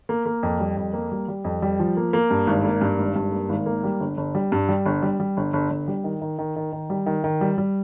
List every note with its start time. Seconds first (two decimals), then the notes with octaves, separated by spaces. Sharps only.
0.09 A#3
0.26 A#3
0.43 F2
0.60 G3
0.77 F2
0.93 A#3
1.12 G3
1.28 G3
1.44 F2
1.62 G3
1.79 F3
1.97 A#3
2.13 A#3
2.31 G2
2.47 G#1
2.64 A#3
2.81 G2
2.98 G#1
3.16 G2
3.32 A#3
3.49 G#1
3.66 A#3
3.84 G3
4.00 G1
4.17 G1
4.35 G3
4.52 G2
4.69 G3
4.86 G1
5.02 G3
5.20 G3
5.37 G1
5.53 G1
5.70 G1
5.88 G3
6.04 D#3
6.22 D#3
6.39 D#3
6.56 D#3
6.72 D#3
6.90 G3
7.06 D#3
7.24 D#3
7.41 G3
7.58 G3